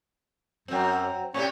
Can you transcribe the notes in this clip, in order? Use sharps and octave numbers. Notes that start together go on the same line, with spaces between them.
F#2 F#3 C4
A2 C3 C#4 G4